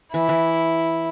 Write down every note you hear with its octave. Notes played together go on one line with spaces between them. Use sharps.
E3 E4
E3